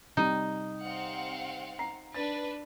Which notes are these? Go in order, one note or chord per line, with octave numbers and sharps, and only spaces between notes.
C3 G3 D#4 D#7
C4 F5 F#5
A#5 C7
D4 B4 A6